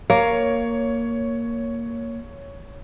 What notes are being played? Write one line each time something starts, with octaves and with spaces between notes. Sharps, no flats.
A#3 C#5